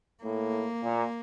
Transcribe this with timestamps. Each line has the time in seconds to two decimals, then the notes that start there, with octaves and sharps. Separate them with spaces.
0.24 A2 A#3
0.84 A#2